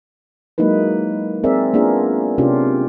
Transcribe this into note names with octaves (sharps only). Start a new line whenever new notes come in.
F#3 G#3 A#3 D#4 E4 B4
C4 G#4 A#4 D5 E5
A#3 B3 D4 F4 G#4 A#4
C3 C#4 D4 F4 G4